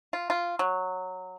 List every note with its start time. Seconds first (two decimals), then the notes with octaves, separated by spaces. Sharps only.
0.13 F4
0.30 F4
0.59 F#3